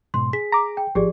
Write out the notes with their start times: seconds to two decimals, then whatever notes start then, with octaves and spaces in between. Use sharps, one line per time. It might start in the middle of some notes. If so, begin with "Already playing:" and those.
0.14 G#2 B2 C6
0.33 G#4 B6
0.52 A#5 D6
0.77 G5
0.95 A1 F3 G4 G#4 D5